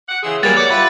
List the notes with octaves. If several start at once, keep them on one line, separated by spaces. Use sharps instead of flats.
F#5 D6
C#3 E3 G#4 C6 E6
F#3 G3 A#3 G#4 B4 F#6 A6
C#5 D5 F#5
F4 G4 B4 E5